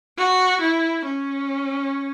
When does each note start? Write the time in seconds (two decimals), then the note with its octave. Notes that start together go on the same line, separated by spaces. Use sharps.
0.17 F#4
0.61 E4
1.05 C#4